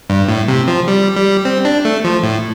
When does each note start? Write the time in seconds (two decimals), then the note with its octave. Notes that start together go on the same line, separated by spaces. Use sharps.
0.10 G2
0.29 A2
0.48 C3
0.67 F3
0.88 G3
1.16 G3
1.45 C4
1.65 D4
1.85 A3
2.04 F3
2.23 A2